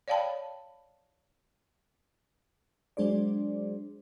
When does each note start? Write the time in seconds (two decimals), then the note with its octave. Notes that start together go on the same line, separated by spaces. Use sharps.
0.08 C#5 D5 F5 G5 A5 B5
2.97 F#3 G#3 D4 G#4 C5 D5